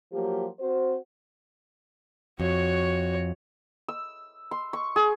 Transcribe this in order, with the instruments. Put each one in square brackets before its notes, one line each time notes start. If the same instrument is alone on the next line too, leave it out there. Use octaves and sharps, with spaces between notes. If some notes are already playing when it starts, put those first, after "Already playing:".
[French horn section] F3 F#3 A#3 G4
C4 F#4 C5
[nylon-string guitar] F2 [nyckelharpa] F#4 C#5
[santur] E6
C6
C#6
G#4